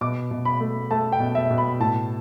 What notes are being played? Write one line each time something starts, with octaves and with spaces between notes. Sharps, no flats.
B2 D6
B2
B5
A3
A3 A5
G5
B2
E5
B2
B5
A2 A5